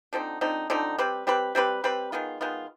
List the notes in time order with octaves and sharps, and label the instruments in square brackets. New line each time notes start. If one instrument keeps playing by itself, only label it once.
[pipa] D3 F3 C4 D#4
D3 F3 C4 D#4
D3 F3 C4 D#4
G3 C4 G4 B4
G3 C4 G4 B4
G3 C4 G4 B4
G3 C4 G4 B4
D#3 G#3 B3 F4
D#3 G#3 B3 F4